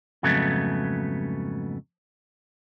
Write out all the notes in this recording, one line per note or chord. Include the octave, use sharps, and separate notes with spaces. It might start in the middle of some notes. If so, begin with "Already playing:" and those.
F2 G#2 C#3 F#3 A3 B3